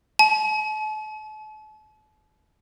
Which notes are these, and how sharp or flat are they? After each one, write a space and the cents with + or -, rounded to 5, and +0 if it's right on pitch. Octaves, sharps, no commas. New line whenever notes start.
A5 -40